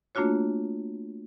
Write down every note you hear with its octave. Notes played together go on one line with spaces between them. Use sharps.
A3 A#3 D4 F4 F#4 C#5